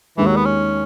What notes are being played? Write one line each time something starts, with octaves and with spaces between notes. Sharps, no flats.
D#2 D#3 E3 G#3
F#3
B3
C#4